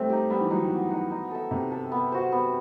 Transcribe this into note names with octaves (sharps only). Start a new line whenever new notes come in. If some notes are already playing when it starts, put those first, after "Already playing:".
Already playing: G3 A3 C4
D#4 G4
G3 B3
E3
F#3 D#4 F#4
D#3
B3
D#4 F#4
D#4
A4 E5
C3 D#4
A4 E5
B3
F#4 C5
B3